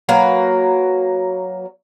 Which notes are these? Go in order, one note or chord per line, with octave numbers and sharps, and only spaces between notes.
F#3 A#3 A#4 B4